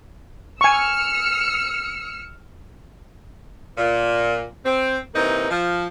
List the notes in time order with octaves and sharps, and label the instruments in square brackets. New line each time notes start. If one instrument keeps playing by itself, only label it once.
[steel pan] G#5 C#6 [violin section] E6 F6 C#7
[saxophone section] A#2
C4
C3 E3 A#3 D#4
F3